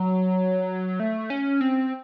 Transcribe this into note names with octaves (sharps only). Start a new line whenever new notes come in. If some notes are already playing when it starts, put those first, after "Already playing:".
Already playing: F#3
A3
C#4
C4